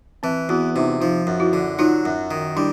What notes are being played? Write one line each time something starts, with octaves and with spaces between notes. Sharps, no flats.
E3 C4
E2 E4 F#4
C3 D#4 F4
F3 D#4 F4
F#2
E4 F#4
D3
F#3 D#4 F4
F#2
D#3
G3 D4 E4